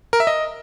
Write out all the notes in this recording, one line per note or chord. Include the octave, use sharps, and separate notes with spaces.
A#4
E5
D#5